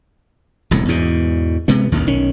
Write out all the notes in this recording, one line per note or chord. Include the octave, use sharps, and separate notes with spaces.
E1 C2 A2
E2 G#2 B2
C3 G#3 B3
A1 D#2 D#3
B1 D#3 C#4